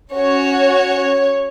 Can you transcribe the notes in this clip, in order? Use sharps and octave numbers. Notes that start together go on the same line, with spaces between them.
C#4 F#4 C#5